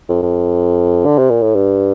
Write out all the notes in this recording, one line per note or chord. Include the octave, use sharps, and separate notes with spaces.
F2
F2
D3
C3
A#2
A2
G2